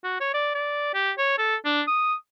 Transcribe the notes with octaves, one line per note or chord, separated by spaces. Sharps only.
F#4
C#5
D5
D5
G4
C#5
A4
D4
D#6